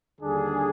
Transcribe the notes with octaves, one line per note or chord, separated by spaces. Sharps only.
D#2 D3 G3 D4 G#4